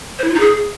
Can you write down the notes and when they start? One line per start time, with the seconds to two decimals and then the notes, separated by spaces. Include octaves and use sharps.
0.19 C5
0.24 E4
0.29 F4
0.34 D#4
0.40 G#4